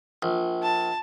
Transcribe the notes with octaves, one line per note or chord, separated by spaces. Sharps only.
A#1
A5